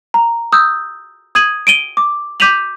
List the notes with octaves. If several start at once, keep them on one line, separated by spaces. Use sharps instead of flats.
A#5
D#6 E6 G6
D#6 G#6 D#7 F#7
D7 D#7 G7
D6
D6 G6 B6 D#7 F7 F#7